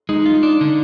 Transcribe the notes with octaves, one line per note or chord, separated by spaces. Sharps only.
G#3 D#4
F4
D4
D3